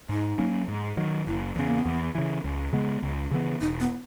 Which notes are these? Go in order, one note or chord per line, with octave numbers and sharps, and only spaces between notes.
G#2 D#4
F#3 A#3 C#4
G#2
D#3 F#3
F#1 E4
E2 C#3 B3
A#3
B3
E2
C#3 E3
C#2
C#3 G#3 B3
C#2
C#3 E3 B3
E1 D#4
B3